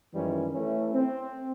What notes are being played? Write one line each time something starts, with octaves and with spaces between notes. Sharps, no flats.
F#2 D#3 E3 G3 G#3 C#4
E3 A3 C#4 E4
C4